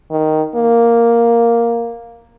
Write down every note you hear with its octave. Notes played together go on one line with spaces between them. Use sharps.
D#3
A#3